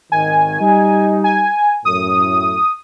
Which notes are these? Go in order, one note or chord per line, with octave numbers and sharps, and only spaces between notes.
G#1 D#3 G#5
G3 D#4
G#5
F#2 A2 D#6